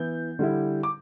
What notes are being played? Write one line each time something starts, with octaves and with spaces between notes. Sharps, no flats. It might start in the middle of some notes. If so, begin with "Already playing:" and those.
Already playing: E3 B3 E4 G6
D3 G3 E4
D6